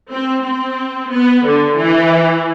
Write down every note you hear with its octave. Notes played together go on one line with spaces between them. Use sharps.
C4
C4
B3
D3
E3